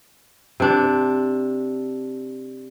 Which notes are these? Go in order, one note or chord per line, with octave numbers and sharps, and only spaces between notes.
C3 D4